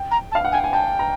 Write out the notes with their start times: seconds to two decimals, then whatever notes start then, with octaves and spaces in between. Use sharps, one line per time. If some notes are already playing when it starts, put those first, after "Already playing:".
Already playing: G5
0.11 A#5
0.32 A5
0.35 F5
0.45 F#5
0.52 G5 G#5
0.64 G#5
0.73 G5 A5
0.99 A#5